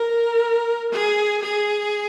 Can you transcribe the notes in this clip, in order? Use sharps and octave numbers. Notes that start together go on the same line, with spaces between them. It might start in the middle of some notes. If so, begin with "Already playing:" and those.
Already playing: A#4
G#4
G#4